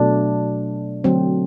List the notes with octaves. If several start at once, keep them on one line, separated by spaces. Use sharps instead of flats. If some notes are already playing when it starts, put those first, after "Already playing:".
Already playing: B2 F#3 A3 D4
D3 F#3 A3 C4